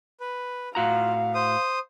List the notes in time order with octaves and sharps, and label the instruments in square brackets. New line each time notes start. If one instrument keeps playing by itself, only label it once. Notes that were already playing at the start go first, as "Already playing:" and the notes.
[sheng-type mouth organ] B4
[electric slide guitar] A2 F#4 A#5 [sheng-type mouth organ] F4 [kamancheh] F5
[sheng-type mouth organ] C5 D#6